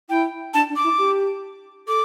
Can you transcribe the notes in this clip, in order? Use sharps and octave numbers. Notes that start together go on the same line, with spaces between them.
E4 G5
D4 A5
D4
D6
E4
G4
A4 D6